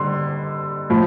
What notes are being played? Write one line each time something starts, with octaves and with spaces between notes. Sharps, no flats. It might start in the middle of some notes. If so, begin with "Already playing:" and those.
Already playing: D3 G3 C6
A2 F3